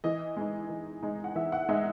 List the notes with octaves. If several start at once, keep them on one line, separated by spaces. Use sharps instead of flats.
E3 D#5
G#3 D#4
E3
G#3 D#4
F#5
E3 E5
F#5
G#3 D#4 E5